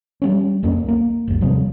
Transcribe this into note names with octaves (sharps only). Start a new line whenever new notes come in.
G3 G#3 C#4
C2 F2 A#3 C#4
A#3
G1 D#2
C3 F3 G3